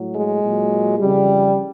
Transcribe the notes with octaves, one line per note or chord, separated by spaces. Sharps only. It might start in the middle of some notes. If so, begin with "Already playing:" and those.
Already playing: A2 F#3
G#3
A#2 F#3
F2 C#3 E3 G3